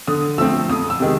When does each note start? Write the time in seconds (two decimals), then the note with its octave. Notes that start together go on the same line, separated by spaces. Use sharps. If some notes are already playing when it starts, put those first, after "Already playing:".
0.07 D3 D#6
0.38 F3 A3 C4 E6
0.69 F2 D#6
0.90 E6
1.00 C3 D#3 G#3